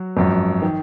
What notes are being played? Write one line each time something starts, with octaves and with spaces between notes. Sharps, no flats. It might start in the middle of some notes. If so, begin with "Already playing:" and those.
Already playing: F#3 F#4
G#1 F#2 F3
D#3